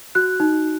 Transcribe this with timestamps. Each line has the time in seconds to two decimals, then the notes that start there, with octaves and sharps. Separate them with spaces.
0.15 F#4 F#6
0.40 D#4